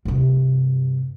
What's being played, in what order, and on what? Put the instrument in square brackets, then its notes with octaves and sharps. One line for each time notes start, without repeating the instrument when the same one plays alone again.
[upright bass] G2 C3